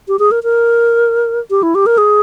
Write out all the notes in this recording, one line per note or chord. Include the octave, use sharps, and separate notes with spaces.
G4
G#4
A#4
A#4
G4
E4
G4
A#4
G#4